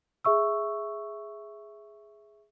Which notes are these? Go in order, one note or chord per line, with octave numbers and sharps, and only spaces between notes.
G#4 E5 C#6 E6